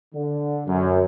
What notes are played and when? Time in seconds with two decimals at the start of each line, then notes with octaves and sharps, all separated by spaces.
0.14 D3
0.67 F#2